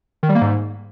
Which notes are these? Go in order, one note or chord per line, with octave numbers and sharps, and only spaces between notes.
D#3
G3
A#3
G#2